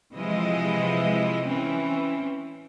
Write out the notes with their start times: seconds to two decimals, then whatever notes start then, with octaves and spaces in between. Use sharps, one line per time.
0.14 C3 E3 F3 G#3 E4 D#5
1.48 E3 C4 C#4